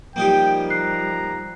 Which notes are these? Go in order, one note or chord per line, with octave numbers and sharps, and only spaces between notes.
F3 G3 A#3 D#4 G4 G5
A#5 F#6 C7